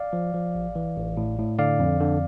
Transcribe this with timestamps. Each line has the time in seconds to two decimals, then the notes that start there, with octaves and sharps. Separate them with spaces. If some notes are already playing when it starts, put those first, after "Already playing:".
Already playing: D5 F5
0.13 F3
0.34 F3
0.55 A1
0.76 E3
0.96 A1
1.17 A2
1.38 A2
1.59 D3 D5 F5
1.80 F2
2.00 D3